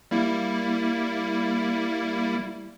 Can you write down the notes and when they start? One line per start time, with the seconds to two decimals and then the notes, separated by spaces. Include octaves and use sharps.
0.11 G3 A#3 E4